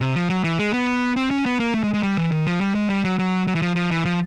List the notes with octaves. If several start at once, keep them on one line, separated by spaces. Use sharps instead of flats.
C3
F3
F#3
E3
G#3
B3
C4
C#4
B3
A#3
A3
G#3
G#3
G3
E3
D#3
F3
G3
G#3
G3
F#3
F#3
F#3
E3
F3
F3
E3
F3